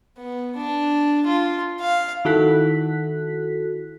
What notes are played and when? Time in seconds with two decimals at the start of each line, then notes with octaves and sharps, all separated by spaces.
0.18 B3
0.57 D4
1.27 F4
1.81 F5
2.25 D#3 E4 F#4 A4 F#6 B6